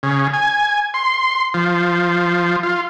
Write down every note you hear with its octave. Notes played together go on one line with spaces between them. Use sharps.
C#3
G#5
C6
F3
F4